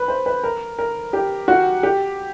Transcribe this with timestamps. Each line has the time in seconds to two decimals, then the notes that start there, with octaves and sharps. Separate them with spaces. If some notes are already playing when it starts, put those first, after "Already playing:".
Already playing: B4
0.08 C5
0.26 B4
0.44 A#4
0.79 A#4
1.13 G4
1.48 F#4
1.83 G4